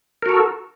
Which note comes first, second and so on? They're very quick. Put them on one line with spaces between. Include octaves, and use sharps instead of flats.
A#4 F#4 A4